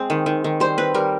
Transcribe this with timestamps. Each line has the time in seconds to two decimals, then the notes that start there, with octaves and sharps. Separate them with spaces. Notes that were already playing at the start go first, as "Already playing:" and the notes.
Already playing: G#3 C4
0.10 D#3
0.26 D#3
0.44 D#3
0.60 G3 C5
0.78 C4 B4
0.94 G3 A#4